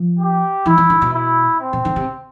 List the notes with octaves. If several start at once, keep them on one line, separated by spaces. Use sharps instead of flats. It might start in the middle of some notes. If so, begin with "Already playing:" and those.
Already playing: F3
G4
E3 E4
E3
D3
B2
E4
C4
B2
D3
C3